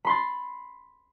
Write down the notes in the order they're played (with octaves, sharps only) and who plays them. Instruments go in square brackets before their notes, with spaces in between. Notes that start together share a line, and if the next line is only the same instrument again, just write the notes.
[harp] B5 C6 A6